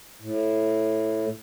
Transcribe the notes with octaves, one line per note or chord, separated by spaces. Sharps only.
A2